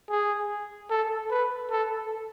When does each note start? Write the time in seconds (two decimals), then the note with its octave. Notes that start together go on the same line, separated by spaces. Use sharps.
0.10 G#4
0.90 A4
1.30 B4
1.71 A4